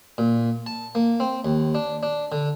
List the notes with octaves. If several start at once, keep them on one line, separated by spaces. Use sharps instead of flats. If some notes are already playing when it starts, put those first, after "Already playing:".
A#2
A5
A#3
C4
D#2
D4
D4
D3